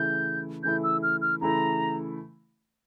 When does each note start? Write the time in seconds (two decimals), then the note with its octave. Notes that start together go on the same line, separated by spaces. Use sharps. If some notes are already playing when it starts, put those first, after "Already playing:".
Already playing: C#3 E3 A3 E4 G6
0.63 C#3 E3 A3 E4 G6
0.84 E6
1.03 F6
1.22 F6
1.41 C#3 E3 A3 E4 A#5